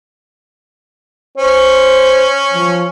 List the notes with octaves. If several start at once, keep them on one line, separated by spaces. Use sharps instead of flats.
C#4 C5
F3